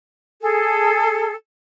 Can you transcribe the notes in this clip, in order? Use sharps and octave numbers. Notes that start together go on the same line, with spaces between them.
G#4 A4